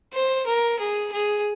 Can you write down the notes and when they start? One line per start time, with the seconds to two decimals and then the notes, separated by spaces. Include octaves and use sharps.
0.13 C5
0.46 A#4
0.80 G#4
1.12 G#4